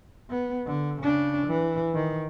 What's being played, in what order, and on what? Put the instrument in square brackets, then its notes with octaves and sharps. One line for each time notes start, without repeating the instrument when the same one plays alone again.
[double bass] B3
D3
C#3 D4
E3
D#3